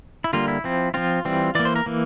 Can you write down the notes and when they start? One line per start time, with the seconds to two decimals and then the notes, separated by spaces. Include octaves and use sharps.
0.24 E4
0.33 D3 G3 A#3 F4
0.48 E4
0.64 F3 C4
0.94 F3 C4 F4
1.25 E3 G3 C4
1.55 E3 A#3 D5
1.65 C5
1.76 A#4
1.86 E3 A#3